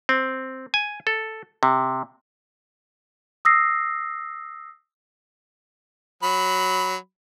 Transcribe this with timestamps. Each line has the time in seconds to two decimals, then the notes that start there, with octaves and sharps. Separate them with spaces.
0.09 C4
0.74 G#5
1.07 A4
1.63 C3
3.45 D#6 E6 A#6 C7
6.23 F#3 B5